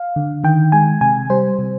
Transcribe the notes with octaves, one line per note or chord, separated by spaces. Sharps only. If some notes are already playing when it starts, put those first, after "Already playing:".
Already playing: F5
D3
D#3 G5
G#3 G#5
C3 G#5
G3 C5
C3